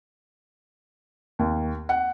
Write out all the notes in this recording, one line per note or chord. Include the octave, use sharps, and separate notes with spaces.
D#2
F#5